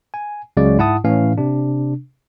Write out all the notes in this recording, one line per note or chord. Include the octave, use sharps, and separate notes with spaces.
G#5
C#2 C#3 F#3 G#3 D5
G#2 E4 F#5 A5 D#6
A2 E3 C#4 F5
C3 D4